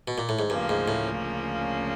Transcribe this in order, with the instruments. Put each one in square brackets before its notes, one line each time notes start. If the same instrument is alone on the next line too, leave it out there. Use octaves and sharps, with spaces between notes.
[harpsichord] B2
A#2
A2
G#2
[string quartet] D2 C#3 F3 A#3 C#4 [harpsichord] G2
[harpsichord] G#2
A2